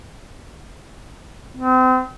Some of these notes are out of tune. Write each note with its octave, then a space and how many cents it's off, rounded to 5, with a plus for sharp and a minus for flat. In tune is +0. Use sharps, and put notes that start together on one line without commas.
C4 -35